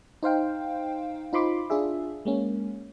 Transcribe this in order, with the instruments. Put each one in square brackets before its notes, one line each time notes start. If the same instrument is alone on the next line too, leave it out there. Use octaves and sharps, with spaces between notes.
[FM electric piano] D#4 C5 F5 G5
D#4 F4 C5 B5 C6 D6
D4 F4 G#4 E5
G#3 A#3 C#4